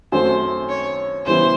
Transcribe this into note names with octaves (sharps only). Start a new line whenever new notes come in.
F#2 D#3 F#3 A3 C4 C5
C#5
C#3 E3 G3 B3 E4 C5